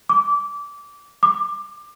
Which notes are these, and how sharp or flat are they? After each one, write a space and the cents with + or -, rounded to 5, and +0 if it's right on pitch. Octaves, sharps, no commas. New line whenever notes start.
D6 -20
D6 +20